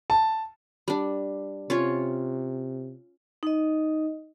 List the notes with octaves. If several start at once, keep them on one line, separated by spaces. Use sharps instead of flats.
A5
G3 D4
C3 C#4 F4 C#5
D#4 D#5